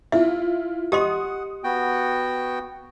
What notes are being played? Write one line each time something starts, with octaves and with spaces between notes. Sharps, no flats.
E4 F4 E5
G4 D#5 F#5 C6 D#6
B3 F#4 G5